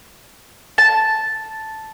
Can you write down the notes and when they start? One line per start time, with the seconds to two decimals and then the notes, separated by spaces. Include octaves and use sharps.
0.78 A5